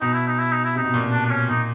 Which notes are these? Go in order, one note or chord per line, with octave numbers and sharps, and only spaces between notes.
B2 D#4
E4
D#4
E4
D#4
E4
C3 D#4
B2
A#2
B2
D4
D4
C#4
A#2 D#4